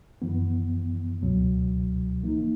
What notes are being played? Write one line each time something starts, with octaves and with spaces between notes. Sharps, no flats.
F#2 E3 B3
C#2 B2 F#3
E3 A#3 D#4